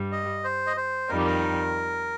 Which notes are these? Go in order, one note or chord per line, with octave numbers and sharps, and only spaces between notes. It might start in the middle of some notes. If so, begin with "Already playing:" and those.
Already playing: G2 G3
D#5
C5
D#5
C5
F2 D#3 G3 D#4 A#4
G4
A#4